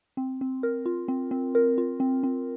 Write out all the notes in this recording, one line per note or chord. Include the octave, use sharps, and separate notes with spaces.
C4
C4
A#4
F4
C4
C4
A#4
F4
C4
C4